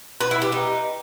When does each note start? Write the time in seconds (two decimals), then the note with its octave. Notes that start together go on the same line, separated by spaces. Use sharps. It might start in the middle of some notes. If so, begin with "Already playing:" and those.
0.21 B4
0.31 E4
0.42 G4
0.52 D#4